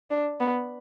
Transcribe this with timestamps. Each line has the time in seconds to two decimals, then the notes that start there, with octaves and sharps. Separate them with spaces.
0.10 D4
0.41 B3